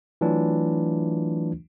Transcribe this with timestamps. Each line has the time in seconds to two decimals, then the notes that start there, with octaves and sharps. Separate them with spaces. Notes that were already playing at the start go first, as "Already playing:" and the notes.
0.21 E3 F#3 A3 D4 F4